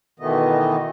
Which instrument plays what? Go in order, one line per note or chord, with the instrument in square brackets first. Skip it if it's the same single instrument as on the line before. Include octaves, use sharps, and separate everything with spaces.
[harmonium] B2 D#3 E3 A3 B3 D#5